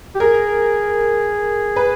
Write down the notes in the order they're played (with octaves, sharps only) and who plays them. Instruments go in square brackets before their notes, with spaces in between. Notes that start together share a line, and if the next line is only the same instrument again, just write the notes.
[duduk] G4
[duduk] G#4 [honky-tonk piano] A#4
[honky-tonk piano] B4